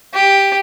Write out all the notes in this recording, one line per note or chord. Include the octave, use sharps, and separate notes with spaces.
G4